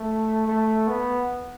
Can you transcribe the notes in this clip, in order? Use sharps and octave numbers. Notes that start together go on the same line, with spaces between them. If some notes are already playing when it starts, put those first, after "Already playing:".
Already playing: A3
A3
B3